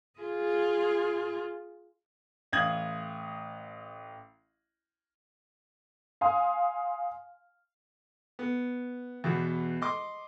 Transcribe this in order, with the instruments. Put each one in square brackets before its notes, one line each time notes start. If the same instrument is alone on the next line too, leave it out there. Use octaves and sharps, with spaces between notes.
[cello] F4 G#4
[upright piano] A1 F5 D#6 G#6 F#7
[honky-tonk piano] F5 G#5 C6 D#6
[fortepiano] B3
E2 B2
D#5 C6 D6